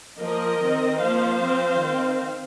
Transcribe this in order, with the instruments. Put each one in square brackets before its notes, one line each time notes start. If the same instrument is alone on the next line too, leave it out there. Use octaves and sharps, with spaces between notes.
[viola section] F3 A#3 A#4 D#5
D#3 C4
F3 A#3 C5 F5
F3 C4
D#3 C4